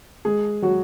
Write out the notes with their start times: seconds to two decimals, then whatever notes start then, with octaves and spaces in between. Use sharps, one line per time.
0.25 G#3 G#4
0.62 F#3 F#4